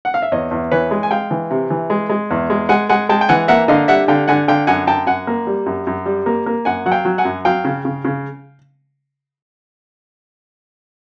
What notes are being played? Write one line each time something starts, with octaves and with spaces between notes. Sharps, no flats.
F#5
F5
E5
E2 C#5 D#5
E2
E3 B4 C#5
G#3
G#5
G#3 F5 G5
E3
C3
E3
G#3
G#3
E2
G#3
G#3 F#5 G#5
G#3 F#5 G#5
G#3 G5 A5
G5
E3 F#5 G#5
A#3 E5 F#5
D3 D#5 F5
G3 E5 F#5
D3 F5 G5
D3 F#5 G#5
D3 F5 G5
F#2 F#5 G#5
F#2 G5 A5
F#2 F#5 G#5
A#3
G3
F#2
F#2
G3
A#3
A#3
F#2 F#5 G#5
F#3 F#5
F5 G5
F#3
F#5 G#5
F#2
F#3 F5 G5
C#3
C#3
C#3